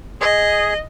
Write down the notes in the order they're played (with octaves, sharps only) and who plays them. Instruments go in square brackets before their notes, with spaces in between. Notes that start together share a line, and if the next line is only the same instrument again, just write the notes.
[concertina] G#4 [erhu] D#5